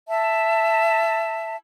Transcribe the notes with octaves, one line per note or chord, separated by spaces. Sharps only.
E5 A5